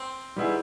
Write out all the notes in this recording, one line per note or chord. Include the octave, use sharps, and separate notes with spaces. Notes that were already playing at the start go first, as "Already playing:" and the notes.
Already playing: C4
D#3 G3 B3 E4 G#4